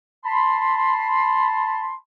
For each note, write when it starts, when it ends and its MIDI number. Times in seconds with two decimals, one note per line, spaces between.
0.24 1.94 81
0.24 1.94 83
0.24 1.94 84